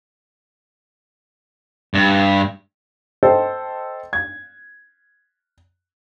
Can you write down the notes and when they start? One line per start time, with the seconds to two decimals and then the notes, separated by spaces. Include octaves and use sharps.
1.94 G2
3.23 A4 C5 D#5 G5
4.13 G#6